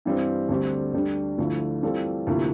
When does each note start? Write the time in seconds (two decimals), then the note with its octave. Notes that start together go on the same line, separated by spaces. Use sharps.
0.05 G2 E3 G3 C4
0.49 D2 D3 G3 C4 G4
0.94 D2 D3 G3 D4
1.38 D2 D3 F3 A3 E4
1.83 E3 G3 C4 F4 A4
2.27 D2 C3 F3 A#3 E4